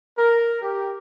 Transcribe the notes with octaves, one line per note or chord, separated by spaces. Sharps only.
A#4
G4